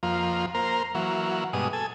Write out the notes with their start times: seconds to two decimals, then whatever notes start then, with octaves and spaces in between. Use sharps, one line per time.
0.03 F2 F3 A#3
0.55 A#3 A#4 C5
0.95 E3 F#3 A#3
1.53 G2 B2 G#3 D#6
1.73 A4 G#5